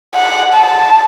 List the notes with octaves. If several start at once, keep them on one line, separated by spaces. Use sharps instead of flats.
F#5
A5